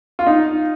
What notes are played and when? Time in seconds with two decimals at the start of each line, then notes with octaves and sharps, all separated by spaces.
0.19 F4
0.27 D#4